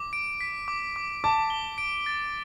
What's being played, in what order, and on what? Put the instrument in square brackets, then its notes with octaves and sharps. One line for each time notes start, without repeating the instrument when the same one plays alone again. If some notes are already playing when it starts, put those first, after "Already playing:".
Already playing: [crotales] D6
D7
B6
D6
D6
[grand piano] A5 [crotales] D6
[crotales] G7
D7
A6